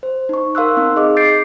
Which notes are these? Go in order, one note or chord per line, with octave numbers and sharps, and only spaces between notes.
C5
D#4 C#6
A#4 F5 C6 E6 F#6
C4 D#4
G#4 D#5 D6
G6 A6 C7 D7